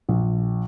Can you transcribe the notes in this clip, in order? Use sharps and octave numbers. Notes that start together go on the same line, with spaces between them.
A#1